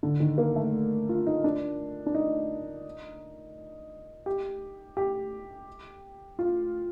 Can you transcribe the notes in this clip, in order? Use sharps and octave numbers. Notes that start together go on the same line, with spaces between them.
D3
D#3
A#3
A3
F4
D#4
D4
D4
D#4
G4
G4
F4